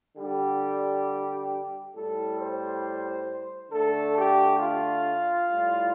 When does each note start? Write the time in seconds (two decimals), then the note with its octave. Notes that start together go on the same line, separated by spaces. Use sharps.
0.17 D3 G3 G4
1.94 A2 G3 A4
2.38 C5
3.70 D3 A3 A4
4.15 G4
4.58 F4
5.47 A2 G3